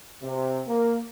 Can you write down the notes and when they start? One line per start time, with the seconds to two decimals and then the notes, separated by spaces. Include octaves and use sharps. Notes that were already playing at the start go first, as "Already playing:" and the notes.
0.22 C3
0.67 A#3